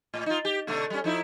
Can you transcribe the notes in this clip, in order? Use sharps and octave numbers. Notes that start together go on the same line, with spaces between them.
A2
D#4 F4
G4
B2 D3 A3
G3 C#4
F3 D#4 E4